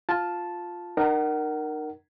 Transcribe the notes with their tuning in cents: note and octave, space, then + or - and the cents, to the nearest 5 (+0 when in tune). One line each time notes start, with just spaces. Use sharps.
F4 +5 A5 -5
D#4 -35 A#4 +0 F#5 +30